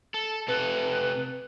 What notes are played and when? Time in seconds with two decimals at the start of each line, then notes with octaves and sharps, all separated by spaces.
0.14 A4
0.48 C3 A4 B4